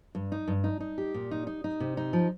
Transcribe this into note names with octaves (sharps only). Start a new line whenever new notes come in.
G2
D#4
G2
D#4
D#4
G4
A#2
D#4
D#4
D#4
C3
D#4
F3